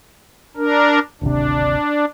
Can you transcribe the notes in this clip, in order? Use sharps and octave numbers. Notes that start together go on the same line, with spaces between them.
D4 A#4
D1 G#1 C3 D4